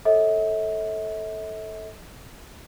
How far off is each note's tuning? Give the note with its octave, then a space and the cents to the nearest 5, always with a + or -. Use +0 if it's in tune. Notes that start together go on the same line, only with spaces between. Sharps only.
A4 +0 C#5 -10 E5 -45